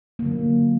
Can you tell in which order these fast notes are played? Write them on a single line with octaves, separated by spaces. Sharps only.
A#3 D3 F#3